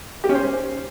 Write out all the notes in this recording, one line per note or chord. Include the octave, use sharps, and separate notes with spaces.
G4
C#4
C5